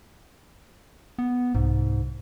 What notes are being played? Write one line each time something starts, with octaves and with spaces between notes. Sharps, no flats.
B3
C2 G#2